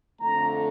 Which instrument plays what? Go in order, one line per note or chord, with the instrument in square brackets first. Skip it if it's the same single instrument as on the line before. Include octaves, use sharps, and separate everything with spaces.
[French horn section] F2 D3 A3 [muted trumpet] A#5